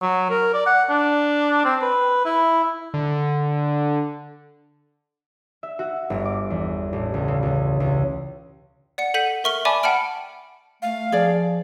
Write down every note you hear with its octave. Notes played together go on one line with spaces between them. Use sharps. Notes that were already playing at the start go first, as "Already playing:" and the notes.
F#3
A#4
D5
F#5
D4
C4
B4
E4
D3
E5
F#4
G1
D6
E2
A1
C#2
C#3
C#2
C#2
D5 F#5 C#7
A4 F#5 G6 B6 D#7
A#4 E5 C#6 F6 G7
D5 E5 G#5 A5 B5 D6
F#5 G5 A5 B5 F6 D7
A3 F5
F3 G#4 D5